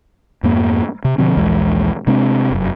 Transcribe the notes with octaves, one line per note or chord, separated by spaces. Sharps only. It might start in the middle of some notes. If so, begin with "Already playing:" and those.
F2 G#2 A#3
C3
B2 D3 F3 C4
A#1 D#2 E3 G#3
C3 G#3 C4 D4
F1 F#2